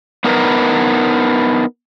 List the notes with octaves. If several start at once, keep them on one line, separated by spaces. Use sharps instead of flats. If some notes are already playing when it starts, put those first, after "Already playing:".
B3 D4 D#4 A#4 B4